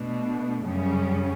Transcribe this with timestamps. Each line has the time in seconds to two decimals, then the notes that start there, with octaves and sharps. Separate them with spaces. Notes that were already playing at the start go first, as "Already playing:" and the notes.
Already playing: B2 A3 D4
0.64 F#2 C#3 G3 C#4